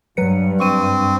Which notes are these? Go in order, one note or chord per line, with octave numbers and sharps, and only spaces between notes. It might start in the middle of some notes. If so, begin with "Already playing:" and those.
G2 F#3 B4 C#7
C4 C#6 D#7